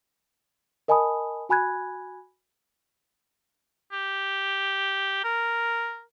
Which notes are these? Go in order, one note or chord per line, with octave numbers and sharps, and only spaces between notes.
A#4 D#5 G#5 A5 B5 D#6
F#4 G#5 B5 F#6 G#6
G4
A#4